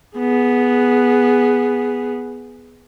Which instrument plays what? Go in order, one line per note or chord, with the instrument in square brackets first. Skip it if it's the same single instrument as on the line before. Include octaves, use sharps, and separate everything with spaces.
[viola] B3 G#4